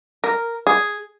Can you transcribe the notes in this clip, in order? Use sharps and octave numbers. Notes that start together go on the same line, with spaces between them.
A#4
G#4